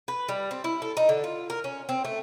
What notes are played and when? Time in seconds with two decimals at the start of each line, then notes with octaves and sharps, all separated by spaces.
0.08 B4
0.29 G3
0.51 C4
0.64 E4
0.82 A4
0.97 D#4
1.09 D3
1.24 F4
1.50 A#4
1.64 C#4
1.89 C4
2.05 A3